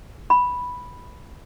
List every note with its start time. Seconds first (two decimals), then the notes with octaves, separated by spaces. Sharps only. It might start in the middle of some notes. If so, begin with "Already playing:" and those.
0.30 B5